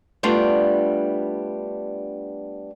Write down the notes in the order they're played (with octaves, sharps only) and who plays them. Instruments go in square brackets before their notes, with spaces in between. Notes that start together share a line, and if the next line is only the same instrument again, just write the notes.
[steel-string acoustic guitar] G3 A3 B3 D4 F4